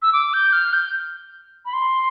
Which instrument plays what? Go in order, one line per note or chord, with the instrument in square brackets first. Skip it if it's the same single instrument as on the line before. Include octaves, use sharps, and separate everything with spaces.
[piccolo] E6
D6
G6
F6
G6
B5
C6